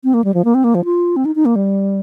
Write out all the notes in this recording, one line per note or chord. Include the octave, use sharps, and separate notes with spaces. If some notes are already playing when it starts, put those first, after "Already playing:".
C4
A#3
G3
F3
A#3
C4
A#3
F3
F4
C4
D#4
D#4
A#3
G3